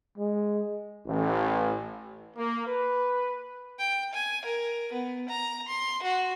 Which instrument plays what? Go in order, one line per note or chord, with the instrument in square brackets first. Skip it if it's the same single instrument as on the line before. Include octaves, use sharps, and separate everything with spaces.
[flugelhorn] G#3
[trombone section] A1
[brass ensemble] A#3
B4
[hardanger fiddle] G5
G#5
A#4
B3
A#5
C6
F#4